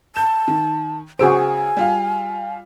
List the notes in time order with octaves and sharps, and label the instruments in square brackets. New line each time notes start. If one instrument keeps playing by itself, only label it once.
[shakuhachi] A5 [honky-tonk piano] G6 E7
[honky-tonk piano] D#3
[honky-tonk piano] C#3 E6 D7 [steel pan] F#4 G#4 C5 [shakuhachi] G#5
[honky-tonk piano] G3 F4 F5